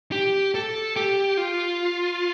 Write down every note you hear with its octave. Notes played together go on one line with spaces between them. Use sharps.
G4
A4
G4
F4